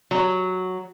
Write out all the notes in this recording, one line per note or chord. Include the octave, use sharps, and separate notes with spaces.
F#3